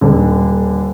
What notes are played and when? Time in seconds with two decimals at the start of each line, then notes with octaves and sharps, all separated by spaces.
0.01 D#1 D3